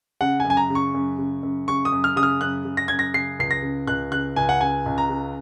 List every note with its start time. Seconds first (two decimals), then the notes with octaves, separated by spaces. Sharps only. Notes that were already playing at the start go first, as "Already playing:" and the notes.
0.21 C#3 F#5
0.40 G#5
0.45 F#2
0.50 G#5
0.57 A#5
0.70 C#3
0.75 C#6
0.94 F#2
1.19 C#3
1.43 F#2
1.68 C#3 C#6
1.85 D#6
1.92 F#2
2.04 F6
2.16 C#3 D#6
2.23 F6
2.41 F#2 F#6
2.65 C#3
2.77 A#6
2.88 F#2 G#6
2.99 A#6
3.14 C#3 C7
3.39 C#2 C7
3.51 A#6
3.62 C#3
3.87 C#2 F#6
4.11 C#3 F#6
4.36 C#2 G#5
4.49 F#5
4.60 C#3 G#5
4.86 C#2
4.98 A#5
5.10 C#3